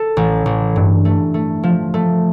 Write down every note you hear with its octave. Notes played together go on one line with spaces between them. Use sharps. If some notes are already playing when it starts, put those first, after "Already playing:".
Already playing: A4
A1
A1
G2
A3
A3
F3
A3